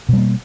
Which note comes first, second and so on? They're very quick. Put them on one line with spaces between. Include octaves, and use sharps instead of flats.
B2 G3 A#3